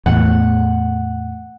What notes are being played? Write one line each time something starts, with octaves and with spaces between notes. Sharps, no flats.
E2 A2 F#5